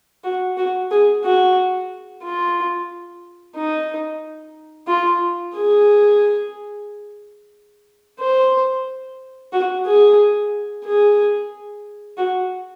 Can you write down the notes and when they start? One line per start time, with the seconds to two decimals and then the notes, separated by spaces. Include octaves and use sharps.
0.24 F#4
0.57 F#4
0.91 G#4
1.24 F#4
2.23 F4
3.56 D#4
4.88 F4
5.55 G#4
8.19 C5
9.53 F#4
9.86 G#4
10.85 G#4
12.17 F#4